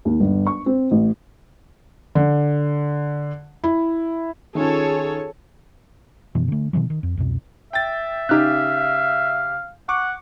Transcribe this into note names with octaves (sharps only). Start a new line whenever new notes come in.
D#2
G1
C#6
C4
A1
D3
E4
D#3 C#4 F4 G#4 A4 C#5
F#2 B2 E3
D3 A3
B2 D#3 E3 F#3
D#3
F2
C2 F2 B2
E5 G5 A6
C#3 D#4 G4 F5 F#6
F#5 C#6 D6